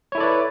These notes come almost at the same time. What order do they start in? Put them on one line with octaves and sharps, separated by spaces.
C#5 E4 A4 D5 B4